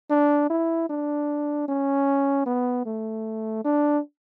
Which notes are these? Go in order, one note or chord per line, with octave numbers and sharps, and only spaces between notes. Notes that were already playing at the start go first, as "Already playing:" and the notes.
D4
E4
D4
C#4
B3
A3
D4